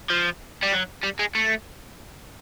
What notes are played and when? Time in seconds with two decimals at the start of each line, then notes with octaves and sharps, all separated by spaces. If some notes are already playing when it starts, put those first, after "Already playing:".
0.10 F3
0.63 G3
0.73 F#3
1.04 G3
1.19 G#3
1.35 A3